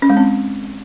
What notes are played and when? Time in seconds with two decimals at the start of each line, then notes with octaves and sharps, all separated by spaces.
0.02 C#4
0.10 G#3
0.17 C4